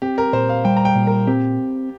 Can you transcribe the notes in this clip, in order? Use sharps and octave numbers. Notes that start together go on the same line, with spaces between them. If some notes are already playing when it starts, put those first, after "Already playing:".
C4 G4
A#4
A#2 C5
F5
G3 G5
A#5
G5
A#2
A#4
C4 G4